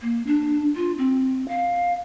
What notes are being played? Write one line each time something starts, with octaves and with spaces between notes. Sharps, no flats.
A#3
D4
F4
C4
F5